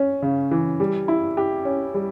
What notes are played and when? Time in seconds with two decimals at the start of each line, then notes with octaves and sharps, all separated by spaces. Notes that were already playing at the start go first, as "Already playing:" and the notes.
Already playing: C#4
0.22 C#3
0.51 E3
0.80 G3
1.08 E4
1.37 G4
1.65 C#4
1.94 G3